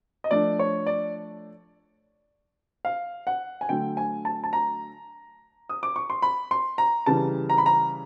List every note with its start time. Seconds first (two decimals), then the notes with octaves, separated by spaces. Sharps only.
0.24 D#5
0.31 F3 A3 D4 D5
0.59 C#5
0.87 D5
2.85 F5
3.27 F#5
3.61 G#5
3.69 D3 F#3 A3 G5
3.97 G#5
4.25 A5
4.44 A5
4.53 A#5
5.69 D#6
5.83 D6
5.96 C#6
6.10 C6
6.22 B5
6.51 C6
6.78 A#5
7.06 C#3 E3 G3 A5
7.50 A#5
7.58 B5
7.66 A#5